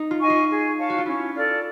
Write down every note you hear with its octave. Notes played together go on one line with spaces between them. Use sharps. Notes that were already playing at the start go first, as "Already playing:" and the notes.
Already playing: D#4
F4
D#5 G#5 C#6
F4
G#4
C#5 F5 A5
F#4
F4
C#4 E4
F4 A4 D5